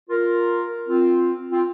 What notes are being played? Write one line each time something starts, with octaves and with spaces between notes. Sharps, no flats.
F4 A#4
C4 F4
C4 F4